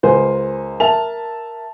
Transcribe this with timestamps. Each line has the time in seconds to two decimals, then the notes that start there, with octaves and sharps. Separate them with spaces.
0.03 C#2 A#4 C5 G#5
0.80 A#4 E5 A5 F7